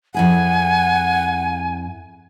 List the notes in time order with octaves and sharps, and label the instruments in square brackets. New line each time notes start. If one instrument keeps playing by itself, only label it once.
[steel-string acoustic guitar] F2 E4 G#4 [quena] F#5 [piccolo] G#5